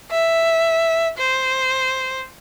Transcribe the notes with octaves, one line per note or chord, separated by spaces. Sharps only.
E5
C5